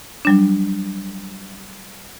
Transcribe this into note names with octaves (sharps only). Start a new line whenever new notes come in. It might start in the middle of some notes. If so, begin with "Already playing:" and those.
F#3 G3 D4